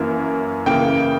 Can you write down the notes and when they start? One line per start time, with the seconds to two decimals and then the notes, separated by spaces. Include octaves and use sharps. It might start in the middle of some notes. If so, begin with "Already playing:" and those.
Already playing: F#2 E3 A#3
0.66 C#3 E3 A#3 G5